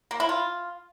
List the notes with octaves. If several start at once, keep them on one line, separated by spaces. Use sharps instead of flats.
A#3
E4
F4